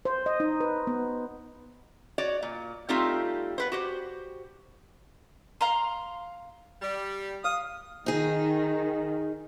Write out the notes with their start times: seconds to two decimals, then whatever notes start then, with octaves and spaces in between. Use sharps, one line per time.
0.05 C5
0.26 D#5
0.40 D#4
0.60 B4
0.87 B3
2.18 F#4 C#5 D5
2.42 A#2
2.89 G3 A3 C4 D#4 F4 G4
3.58 B3 B4 C5
3.72 F#4 G4 C5
5.61 F5 A#5 C6
6.82 G3
7.44 F5 D#6
8.06 D#3 D#4 G#4